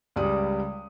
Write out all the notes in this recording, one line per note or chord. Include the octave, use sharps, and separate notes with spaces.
C#2 C#3 G3 D5 D#6